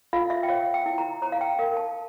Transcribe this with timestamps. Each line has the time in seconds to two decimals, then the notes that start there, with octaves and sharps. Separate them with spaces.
0.13 F4 F5
0.30 E5
0.43 G5
0.49 C#5 F5
0.74 G5
0.86 E4
0.98 A#5
1.22 C#5 A#5
1.32 F5
1.41 G5
1.59 A#4 F5
1.77 A5